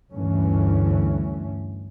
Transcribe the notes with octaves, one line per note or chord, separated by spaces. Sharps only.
D2 G2 E3 A3 C#4